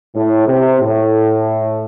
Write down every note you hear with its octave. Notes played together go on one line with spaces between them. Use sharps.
A2
C3
A2